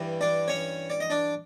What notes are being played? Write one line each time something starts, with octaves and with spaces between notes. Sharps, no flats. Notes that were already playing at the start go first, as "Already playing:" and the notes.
Already playing: G2 E3 G3
D4 D5
C#4 C#5
D5
D#5
D4 D5